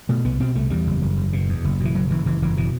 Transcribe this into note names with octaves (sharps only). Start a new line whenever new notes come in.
B2 A3
C2 B3
B2 C4
C2 A3
E2 G3
F#1
F#1
F#1
B2
E2
F#1
B2
E3
F#1 F#3
F#1 E3
F#1 E3
F#1 E3
B2 E3